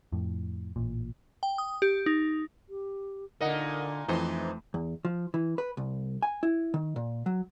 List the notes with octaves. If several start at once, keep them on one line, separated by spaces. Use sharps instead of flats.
F2 A2
A1 A#2
G5
D#6
G4
D#4
G4
A#2 D3 D#4 A#4 D#5 F#5
F2 E3 A3 D#4 C5
E2
F3
E3
B4
C2
G#5
E4
D#3
A#2
F#3